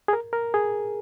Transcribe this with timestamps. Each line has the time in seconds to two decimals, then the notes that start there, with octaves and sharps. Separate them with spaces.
0.08 G#4
0.13 A#4
0.33 A#4
0.54 G#4